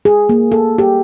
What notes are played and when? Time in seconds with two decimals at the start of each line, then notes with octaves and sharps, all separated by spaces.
0.05 G#4
0.29 A#3
0.52 A4
0.78 G4